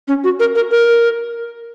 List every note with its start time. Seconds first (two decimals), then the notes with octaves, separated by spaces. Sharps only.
0.08 C#4
0.24 F#4
0.40 A#4
0.55 A#4
0.71 A#4